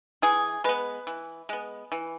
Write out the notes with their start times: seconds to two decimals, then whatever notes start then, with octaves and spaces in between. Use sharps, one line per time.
0.22 E3 G#4
0.64 G#3 B3 B4
1.07 E3
1.49 G#3 B3
1.92 E3